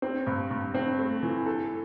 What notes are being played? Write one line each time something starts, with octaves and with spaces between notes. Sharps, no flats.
C4
G2
G2
C4
A3
E3
A4